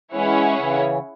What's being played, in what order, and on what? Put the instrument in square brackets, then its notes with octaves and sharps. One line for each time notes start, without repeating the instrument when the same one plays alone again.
[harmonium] E3 G#3 [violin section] C#4 E4 G#4 C#5 F#5
[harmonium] C#3 E3